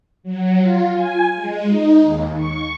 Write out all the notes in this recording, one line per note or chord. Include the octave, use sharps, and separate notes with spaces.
F#3
F4
G#5
G#3
D#4
D#2
C#6